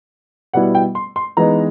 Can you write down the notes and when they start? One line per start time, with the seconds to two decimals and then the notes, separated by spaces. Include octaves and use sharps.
0.53 B2 G3 B3 E4 F#5
0.75 G5
0.95 C6
1.16 C6
1.37 E3 G#3 B3 D#4 A#5